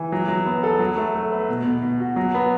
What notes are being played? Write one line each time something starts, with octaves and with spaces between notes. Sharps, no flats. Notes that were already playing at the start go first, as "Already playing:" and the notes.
Already playing: E3
F#3
F#3
B3
A4
F#3
A3
A3
B4
B2
B2
B2
F#4
F#3
B3